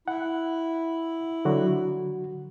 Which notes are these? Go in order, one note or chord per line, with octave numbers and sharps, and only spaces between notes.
E4 F#5
D3 F#3 F#4